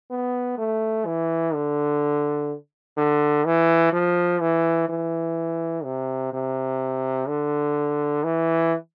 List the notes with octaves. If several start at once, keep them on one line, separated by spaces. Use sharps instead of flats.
B3
A3
E3
D3
D3
E3
F3
E3
E3
C3
C3
D3
E3